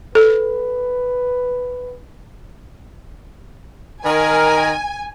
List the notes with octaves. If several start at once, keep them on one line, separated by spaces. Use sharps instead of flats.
A4 B4
D#3 A#4 G#5